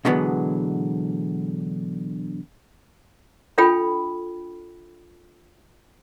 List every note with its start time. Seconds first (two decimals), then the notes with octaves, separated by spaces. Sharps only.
0.05 B2 D3 E3 F#3 G#3 B3
3.58 D4 F4 A4 G5 B5